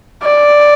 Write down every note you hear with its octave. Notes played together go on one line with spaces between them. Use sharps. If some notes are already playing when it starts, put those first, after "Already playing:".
D5